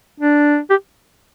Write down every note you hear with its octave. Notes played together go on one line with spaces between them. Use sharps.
D4
G4